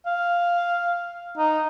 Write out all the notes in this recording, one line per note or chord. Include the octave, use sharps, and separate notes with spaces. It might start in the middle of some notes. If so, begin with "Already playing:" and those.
F5
D#4